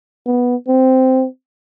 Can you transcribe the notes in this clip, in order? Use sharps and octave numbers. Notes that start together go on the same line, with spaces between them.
B3
C4